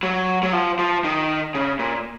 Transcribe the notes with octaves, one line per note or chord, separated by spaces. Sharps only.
F#3
F#3
F3
F3
D#3
C#3
A#2